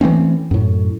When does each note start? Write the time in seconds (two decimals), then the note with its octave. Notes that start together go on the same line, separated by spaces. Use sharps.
0.01 E3 A3 C4 C#4
0.51 F#2 A2